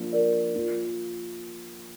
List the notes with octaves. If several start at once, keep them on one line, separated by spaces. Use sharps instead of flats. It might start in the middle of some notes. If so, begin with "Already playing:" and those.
Already playing: F3 A#3 D4
A#4 D5
F3 A#3 F4